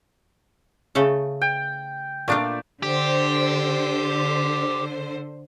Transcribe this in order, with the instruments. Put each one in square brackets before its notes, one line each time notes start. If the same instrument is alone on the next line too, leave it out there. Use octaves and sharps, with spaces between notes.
[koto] C#3 A3 A4
[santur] G5
[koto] A#2 D4 F4 [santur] A3 D5
[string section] D3 C5 [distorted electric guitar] G4